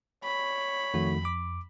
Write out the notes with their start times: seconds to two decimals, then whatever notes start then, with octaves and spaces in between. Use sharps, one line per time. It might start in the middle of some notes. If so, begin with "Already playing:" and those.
0.24 C#5 B5
0.94 F2 D#3 A3 F#4
1.25 D6